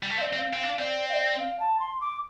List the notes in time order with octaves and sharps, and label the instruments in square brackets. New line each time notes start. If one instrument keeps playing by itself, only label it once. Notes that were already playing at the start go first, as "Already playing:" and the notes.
[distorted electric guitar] G3
A3
[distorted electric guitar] C4 [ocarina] F5
[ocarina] D5
[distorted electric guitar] C4
[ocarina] F5
[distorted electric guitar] C4
[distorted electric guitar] D4 [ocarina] F5
[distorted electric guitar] C4 [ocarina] D5
[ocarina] F5
D5
F5
A5
C6
D6